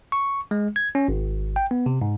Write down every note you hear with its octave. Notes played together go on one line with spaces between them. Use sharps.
C#6
G#3
G#6
C#4
G#1
G5
B3
C3
G#2